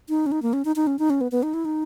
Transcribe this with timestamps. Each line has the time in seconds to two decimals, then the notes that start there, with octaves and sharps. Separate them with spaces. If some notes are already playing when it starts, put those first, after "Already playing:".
0.09 D#4
0.26 C#4
0.32 D#4
0.42 A#3
0.53 C#4
0.65 D#4
0.76 D#4
0.87 C#4
0.99 D#4
1.10 C#4
1.21 B3
1.32 B3
1.43 D#4
1.54 E4
1.65 D#4